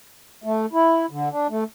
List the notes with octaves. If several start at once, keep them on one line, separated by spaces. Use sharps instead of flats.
A3
E4
D3
D4
A3